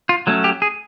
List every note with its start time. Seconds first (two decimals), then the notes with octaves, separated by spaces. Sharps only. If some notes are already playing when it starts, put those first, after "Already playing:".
0.09 F4
0.27 F#3 A3 C#4
0.44 G4
0.62 G#4